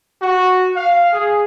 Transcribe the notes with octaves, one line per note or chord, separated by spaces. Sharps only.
F#4
F5
G#4